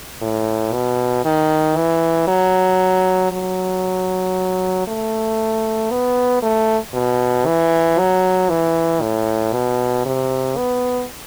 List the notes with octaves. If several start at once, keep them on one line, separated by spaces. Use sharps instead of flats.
A2
B2
D#3
E3
F#3
F#3
A3
B3
A3
B2
E3
F#3
E3
A2
B2
C3
B3